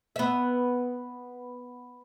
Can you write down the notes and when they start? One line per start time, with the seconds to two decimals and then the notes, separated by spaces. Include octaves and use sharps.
0.16 B3 E5